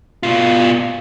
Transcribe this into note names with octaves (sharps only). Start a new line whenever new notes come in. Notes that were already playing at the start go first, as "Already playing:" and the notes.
B2 F4